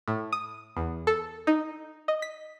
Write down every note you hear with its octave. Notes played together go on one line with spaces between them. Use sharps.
A2
D#6
E2
A4
D#4
D#5
B6